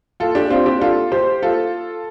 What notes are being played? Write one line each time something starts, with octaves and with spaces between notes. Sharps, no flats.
F4 A4
D4 G4
C4 F4
D4 G4
F4 A4
G4 C5
F4 A4